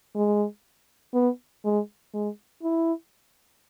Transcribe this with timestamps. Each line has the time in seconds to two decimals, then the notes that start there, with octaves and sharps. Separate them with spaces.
0.15 G#3
1.14 B3
1.65 G#3
2.14 G#3
2.63 E4